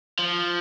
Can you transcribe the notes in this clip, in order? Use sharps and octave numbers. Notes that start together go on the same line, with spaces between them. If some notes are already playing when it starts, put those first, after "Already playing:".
F3